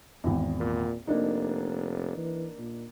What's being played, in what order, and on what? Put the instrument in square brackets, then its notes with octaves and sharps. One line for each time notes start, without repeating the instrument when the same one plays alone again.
[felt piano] G#1 E2
[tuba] A#2
[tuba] F1 [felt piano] A#3 D4 D#4
[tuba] E3
A#2